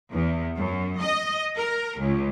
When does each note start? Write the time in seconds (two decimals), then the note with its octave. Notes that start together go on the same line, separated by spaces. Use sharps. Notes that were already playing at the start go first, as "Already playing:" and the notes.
0.11 E2
0.56 F#2
0.99 D#5
1.56 A#4
2.00 C#2